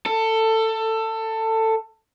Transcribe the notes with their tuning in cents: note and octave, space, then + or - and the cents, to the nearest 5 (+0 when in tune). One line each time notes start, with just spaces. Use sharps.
A4 +20